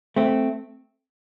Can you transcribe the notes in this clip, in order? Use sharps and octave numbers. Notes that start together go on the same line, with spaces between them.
A3 C4